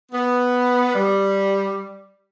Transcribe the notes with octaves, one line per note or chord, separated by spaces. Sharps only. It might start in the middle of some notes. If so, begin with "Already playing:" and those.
B3
G3